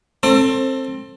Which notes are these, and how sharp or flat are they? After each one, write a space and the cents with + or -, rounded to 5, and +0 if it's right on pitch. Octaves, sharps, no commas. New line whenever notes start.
C4 +20 A4 +20